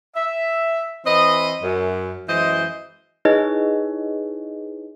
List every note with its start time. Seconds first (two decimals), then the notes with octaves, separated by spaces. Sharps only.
0.16 E5
1.05 E3 C4 B4 D#5
1.62 F#2
2.28 F#2 E3 G#3 C5 D#5
3.25 D#4 E4 G#4 B4 C#5 D#5